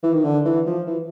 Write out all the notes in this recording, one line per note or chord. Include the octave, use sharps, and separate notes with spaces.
E3
D#3
D3
E3
F3
E3